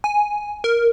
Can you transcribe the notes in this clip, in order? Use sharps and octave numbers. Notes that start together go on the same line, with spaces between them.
G#5
A#4